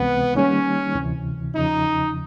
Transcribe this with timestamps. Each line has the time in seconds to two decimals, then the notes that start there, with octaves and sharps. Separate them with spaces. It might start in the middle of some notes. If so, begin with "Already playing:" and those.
Already playing: C#2 C3 E3 G#3 B3 C4
0.35 D#3 G3 A#3 C#4 D#4
0.95 D2 C3 E3
1.54 E2 C#3 F3 D#4